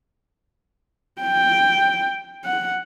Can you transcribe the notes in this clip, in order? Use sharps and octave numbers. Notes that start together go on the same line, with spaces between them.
G5
F#5